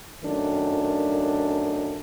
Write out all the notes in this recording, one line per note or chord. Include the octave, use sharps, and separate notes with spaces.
F#2 D#3 A3 D4